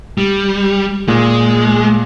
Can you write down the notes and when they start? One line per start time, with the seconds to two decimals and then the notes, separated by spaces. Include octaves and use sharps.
0.18 G3
1.08 A#2 G#3